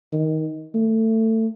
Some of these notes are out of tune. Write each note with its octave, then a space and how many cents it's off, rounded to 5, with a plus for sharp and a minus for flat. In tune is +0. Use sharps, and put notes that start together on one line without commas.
D#3 +15
A3 +20